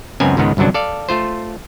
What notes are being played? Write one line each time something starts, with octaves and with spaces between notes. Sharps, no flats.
C#2 F#2 B3 C4 A#4 G#5
C#2 G#2 D#3 B3 D#4
G1 C2 F#2 F#3 D4
A4 D5 F5
A3 F4 C5